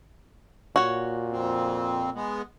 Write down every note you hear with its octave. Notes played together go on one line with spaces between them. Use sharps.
A#2 F#4 C#5
F2 C4
G#3 B3